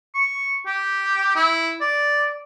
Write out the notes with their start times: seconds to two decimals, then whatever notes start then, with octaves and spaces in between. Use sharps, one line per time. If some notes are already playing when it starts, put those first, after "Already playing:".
0.15 C#6
0.67 G4
1.36 E4
1.81 D5